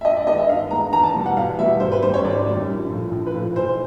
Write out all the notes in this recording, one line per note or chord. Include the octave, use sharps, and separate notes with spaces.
E5
G2 D#5
D5
D#3 G#3 B3 D#5
E5
G2 F5
D#3 G#3 B3 A#5
E2 A#5
A5
B2 G3 B3
F#5
E2 F5
B2 G3 B3 E5
G#1 C5
B4
F#2 D#3 G3 C5
C#5
G#1 D5
F#2 D#3 G3
A#1
A2 F3 A3
A#1
B4
A2 F3 A3
B1 C5